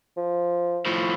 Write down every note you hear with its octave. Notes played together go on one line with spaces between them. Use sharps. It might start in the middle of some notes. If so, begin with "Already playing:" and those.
F3
A2 F3